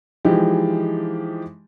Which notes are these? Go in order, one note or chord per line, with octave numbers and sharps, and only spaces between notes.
E3 F3 G#3 D#4 G4